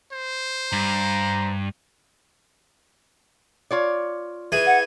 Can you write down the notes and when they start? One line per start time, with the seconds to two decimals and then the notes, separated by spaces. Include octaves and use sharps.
0.12 C5
0.73 G2 A#5
3.71 F4 C#5 D5
4.52 E3 G#4 G#6
4.66 F#5